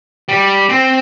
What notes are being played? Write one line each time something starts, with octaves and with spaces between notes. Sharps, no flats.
G3
C4